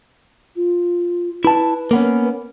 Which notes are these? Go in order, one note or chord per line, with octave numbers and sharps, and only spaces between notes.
F4
E4 B4 A5
A#3 B3 C#4